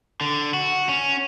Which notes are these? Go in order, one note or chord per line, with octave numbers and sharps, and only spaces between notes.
D3
F#4
C#4